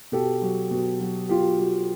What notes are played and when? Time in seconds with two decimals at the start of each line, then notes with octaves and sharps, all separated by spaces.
0.12 B2 G4 A4
0.42 F#3
0.71 B2
1.00 F#3
1.29 B2 F4 G4
1.59 F#3